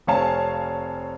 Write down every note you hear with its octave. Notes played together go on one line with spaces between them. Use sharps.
F1 C4 C#5 F5 G#5 A5